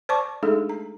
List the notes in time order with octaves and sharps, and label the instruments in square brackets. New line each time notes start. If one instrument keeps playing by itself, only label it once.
[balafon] C5 D5 A5 C#6 D6
G#3 A3 D4 D#4 G#4 A4
A#5